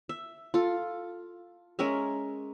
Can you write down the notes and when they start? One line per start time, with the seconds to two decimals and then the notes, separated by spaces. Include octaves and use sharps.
0.09 E5
0.54 F4 A4
1.79 G#3 C#4 A#4 E5